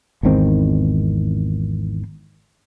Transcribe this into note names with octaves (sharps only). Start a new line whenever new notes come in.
G#1 E2 D#3 C4